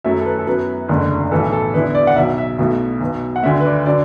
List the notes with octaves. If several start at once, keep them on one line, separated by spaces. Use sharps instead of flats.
F#2 F#3 A3 E4 E5
A4
B4
A4
F#2 F#3 B3 E4 B4
F#1 E2 D3 A3
B1 A2 E3 B3 A4
A4
E2 D3 B3 E4 B4
D5
F#5
B1 B2 F#3 E5
E5
B1 B2 A3 E4
B1 B2 B3
F#5
D2 D3 A3 E5
B4
D5
D3 F#3 D5